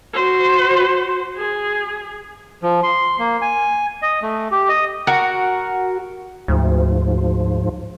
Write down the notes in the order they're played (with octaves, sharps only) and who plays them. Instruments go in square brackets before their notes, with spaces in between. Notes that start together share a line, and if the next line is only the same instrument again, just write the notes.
[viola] F#4 C5
G#4
[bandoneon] F3
C6
A#3
G#5
D#5
A3
G4
D#5
[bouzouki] F#4 A#4
[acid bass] D2 [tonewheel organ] G#2 F3